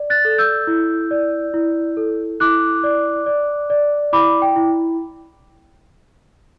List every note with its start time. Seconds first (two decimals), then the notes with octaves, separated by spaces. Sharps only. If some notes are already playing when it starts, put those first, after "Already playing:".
Already playing: D5
0.10 F#6 A6
0.25 A4
0.38 E6 G6
0.67 E4
1.11 D5
1.54 E4
1.97 A4
2.40 E4 D6 F#6
2.84 D5
3.26 D5
3.70 D5
4.12 E4 B5 D6
4.42 G5
4.56 E4